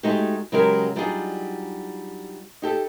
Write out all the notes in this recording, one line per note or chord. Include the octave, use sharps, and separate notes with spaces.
G#3 A3 D#4 F#4 G4
C#3 F#3 G#3 G4 A#4
F#3 G3 D4 D#4 F4 G#4
D#4 G4 A4